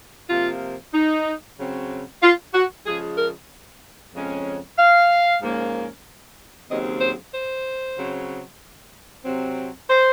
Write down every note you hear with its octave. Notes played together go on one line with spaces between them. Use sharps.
C3 F3 A#3 F4
D#4
C#3 F#3 C4
F4
F#4
C#3 F3 G#3 G#4
A#4
F2 C#3 G#3 C#4
F5
G#2 F3 A#3 C#4
D#2 C#3 F#3 C4 D#5
C5
C5
C#3 F#3 C4
C3 F#3 C4
C5